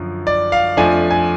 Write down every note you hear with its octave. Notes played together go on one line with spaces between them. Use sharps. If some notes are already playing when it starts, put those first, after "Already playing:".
Already playing: F#2 D3 F3
D5
F5
F2 F3 A3 D4 G#5
G#5